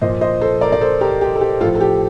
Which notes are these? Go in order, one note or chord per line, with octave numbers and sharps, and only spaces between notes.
A#2 F3 C5 D#5
C5 D#5
A4 C5
A#4 D5
D5
A4 C5
G4 A#4
G4
A4
G4
A2 F3 F4 A4
A4
G4